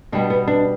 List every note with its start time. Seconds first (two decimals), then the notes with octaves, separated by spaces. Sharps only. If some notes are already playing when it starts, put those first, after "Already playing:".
0.12 B2 G3 B3 D4
0.30 B3
0.48 D4